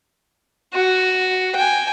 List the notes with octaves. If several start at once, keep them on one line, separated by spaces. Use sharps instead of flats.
F#4
G5 G#5